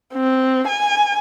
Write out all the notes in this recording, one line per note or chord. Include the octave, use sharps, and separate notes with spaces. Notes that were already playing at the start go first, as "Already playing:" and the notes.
C4
G#5